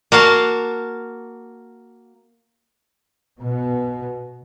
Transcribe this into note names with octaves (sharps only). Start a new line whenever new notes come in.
A#3 F#4 F5 A5
B2